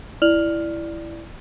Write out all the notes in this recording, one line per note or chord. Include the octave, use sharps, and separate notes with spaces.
E4 D5 F6 F7 F#7